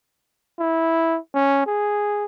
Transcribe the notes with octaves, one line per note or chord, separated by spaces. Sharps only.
E4
C#4
G#4